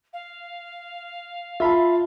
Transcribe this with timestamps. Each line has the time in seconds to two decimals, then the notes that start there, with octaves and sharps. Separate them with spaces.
0.13 F5
1.60 F4 E5 A5 B5